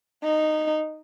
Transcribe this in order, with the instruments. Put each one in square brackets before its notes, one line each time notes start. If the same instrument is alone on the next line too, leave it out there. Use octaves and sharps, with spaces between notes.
[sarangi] D#4